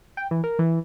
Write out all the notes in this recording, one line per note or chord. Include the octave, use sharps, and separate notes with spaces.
G5
E3
A#4
E3